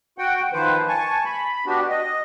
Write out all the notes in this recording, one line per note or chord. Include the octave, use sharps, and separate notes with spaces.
F#4 F#5 G5
D#3 F3 B4 C5
G#5 A5 C#6
B5
B3 D4 F#4 G4
D#5